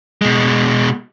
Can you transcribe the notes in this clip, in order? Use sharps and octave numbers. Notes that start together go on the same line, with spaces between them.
B2 G#3